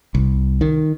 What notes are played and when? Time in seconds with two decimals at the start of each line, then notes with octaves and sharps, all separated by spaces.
0.15 C2
0.61 D#3